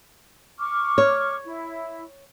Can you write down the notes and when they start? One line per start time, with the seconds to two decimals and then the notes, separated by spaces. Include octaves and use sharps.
0.59 C#6 D6 F6
0.98 C#5
1.45 E4